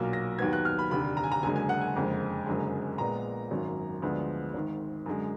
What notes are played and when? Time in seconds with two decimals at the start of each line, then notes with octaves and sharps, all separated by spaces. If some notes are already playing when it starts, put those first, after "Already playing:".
Already playing: B1 A#2 F#3 A#3
0.13 A#6
0.39 D#2 D#3 F#3 B3 G#6
0.53 F#6
0.65 F6
0.79 B5
0.91 F1 D#2 D3 B5
1.17 A#5
1.24 G#5
1.32 A#5
1.43 F#1 F#2 D3 G#3 G#5
1.56 G#5
1.69 F#5
1.81 G#5
1.96 F#1 F2 D3 G#3
2.46 F#1 F#2 D3 G#3
2.98 A#1 A#2 G#3 B3 A#5
3.51 G#1 F#2 D#3 F#3
4.02 D2 D3 F3 G#3 B3
4.54 G#1 G#2 D#3
5.06 F#2 D3 G#3